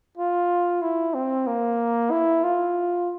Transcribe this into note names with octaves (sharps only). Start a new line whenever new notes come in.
F4
E4
C4
A#3
E4
F4